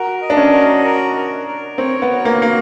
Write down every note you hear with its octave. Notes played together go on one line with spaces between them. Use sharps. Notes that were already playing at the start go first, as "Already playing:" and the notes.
Already playing: F#4 A#4
D#5
D4
C#4
F#4
A#4
A#4
A#4
C4 C#5
B3
F#4
A#3
A#3 F#4